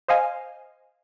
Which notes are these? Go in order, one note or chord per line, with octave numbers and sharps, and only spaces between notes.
C5 D#5 F5 G#5